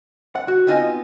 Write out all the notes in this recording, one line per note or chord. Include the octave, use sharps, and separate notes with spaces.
F#5
F#4
B3 C4 D#4 F4 D#5 G#5